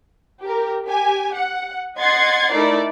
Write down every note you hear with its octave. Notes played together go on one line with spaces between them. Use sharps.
G4 A#4
G4 G#5
F#5
D#5 F#5 C6 G#6 A6 C7
A3 D#4 E4 A#4 D5